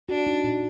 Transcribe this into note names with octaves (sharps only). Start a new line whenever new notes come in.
D4 F#4
D#4
A#2